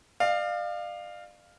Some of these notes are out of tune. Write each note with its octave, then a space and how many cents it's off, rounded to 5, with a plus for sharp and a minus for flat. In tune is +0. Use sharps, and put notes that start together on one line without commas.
D5 +40 F5 +0